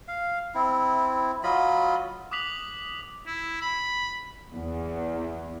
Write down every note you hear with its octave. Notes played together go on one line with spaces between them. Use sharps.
F5
C4 E4
F#3 F4 D#5 B5
D6 D#6 F#6 B6 F7 F#7
E4
B5
E2